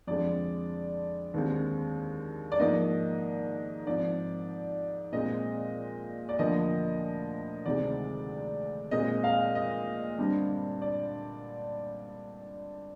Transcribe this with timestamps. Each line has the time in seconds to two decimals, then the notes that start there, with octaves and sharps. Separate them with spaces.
0.07 F2 D3 G#3 C4 D5
1.34 D#2 D3 G#3 C4
2.52 D5
2.60 G#2 F3 A#3 D#5
3.87 G#2 F3 C4 D5
5.12 A#2 G#3 C4 D#5
6.29 D5
6.39 D2 D3 F3 A#3 D#5
7.66 D2 C3 D#3 G#3 C4 D5
8.91 A#2 G#3 C4 D#5
9.24 F5
9.55 D#5
10.18 G2 D3 G3 C4
10.82 D5